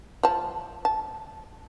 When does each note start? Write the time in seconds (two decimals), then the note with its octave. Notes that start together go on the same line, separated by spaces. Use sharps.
0.23 F3 A5
0.85 A5